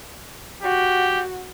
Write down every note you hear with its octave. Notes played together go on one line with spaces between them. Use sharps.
F#4 G4